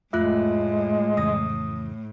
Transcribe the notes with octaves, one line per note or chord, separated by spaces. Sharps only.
F2 A2 G#3 A3 F4 E5 F#6
F2 C#3 E3 D#6 A#6